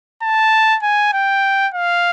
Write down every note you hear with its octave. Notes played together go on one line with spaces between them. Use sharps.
A5
G#5
G5
F5